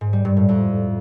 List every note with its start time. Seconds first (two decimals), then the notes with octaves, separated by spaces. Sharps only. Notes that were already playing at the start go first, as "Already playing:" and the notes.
0.01 G#2
0.13 G3
0.25 G2
0.37 A2
0.49 F2